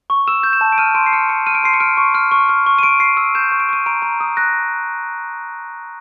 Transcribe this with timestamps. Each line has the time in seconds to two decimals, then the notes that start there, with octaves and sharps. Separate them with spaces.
0.10 C#6
0.28 E6 E7
0.43 G6
0.53 E7
0.61 A5
0.72 D7
0.78 F6 D#7
0.95 C6 D7
1.06 C7
1.13 F6 C#7
1.29 C6 C#7
1.47 F6 D#7
1.55 D7
1.64 C6 C7
1.74 C#7
1.80 F6 D7
1.97 C#6
2.15 F6
2.31 C#6
2.49 F6
2.66 C#6
2.78 D#7
2.83 C#6 D7
3.00 C#6 C7
3.17 E6 D7
3.35 G6 E7
3.52 C#6
3.60 D7
3.69 C#6 D#7
3.86 A#5 D7
4.02 A#5
4.20 D#6
4.37 F#6 A#6